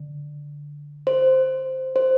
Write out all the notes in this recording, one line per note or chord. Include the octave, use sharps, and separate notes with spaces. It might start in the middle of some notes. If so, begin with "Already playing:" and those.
Already playing: D3
C5
C5